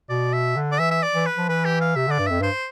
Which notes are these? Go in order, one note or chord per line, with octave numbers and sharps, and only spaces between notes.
B2 D5
E5
D3
D5
E3 E5
E5
D5
E3
B4
F3
E3 B4
G4
F5
C3 E5
D3 D5
G2
F2 E5
G2 C5